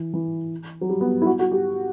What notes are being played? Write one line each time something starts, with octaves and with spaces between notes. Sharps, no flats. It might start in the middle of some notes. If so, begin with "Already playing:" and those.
Already playing: E3
E3
F#3
G3
B3
E4
F#4
F#4
G4